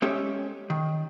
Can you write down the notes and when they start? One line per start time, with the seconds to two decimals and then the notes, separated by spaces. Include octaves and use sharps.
0.02 G#3 C#4 G4 A4 C#5 E5
0.70 D#3